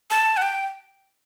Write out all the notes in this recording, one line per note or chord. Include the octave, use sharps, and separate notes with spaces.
A5
F#5
G5